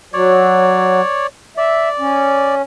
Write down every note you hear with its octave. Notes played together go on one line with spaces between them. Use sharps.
F#3 C#5 D5
D5 E5
C#4